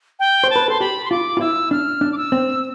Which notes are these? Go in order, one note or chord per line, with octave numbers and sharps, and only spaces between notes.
G5
C5
A5
B4
A4 C6
G4 B5
C6
F4 D6
F4
E4 E6
D4 F6
D4
D6
E6
C4